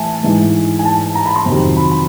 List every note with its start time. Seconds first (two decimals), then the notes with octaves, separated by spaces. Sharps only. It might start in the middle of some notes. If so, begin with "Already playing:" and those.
Already playing: A2 E3 E5 G#5 A5
0.23 G#2 E3 G#3
0.79 G#5
0.85 A5
1.15 A#5
1.26 B5
1.36 C6
1.46 F2 C3 D#3 F#3
1.77 B5
1.92 B5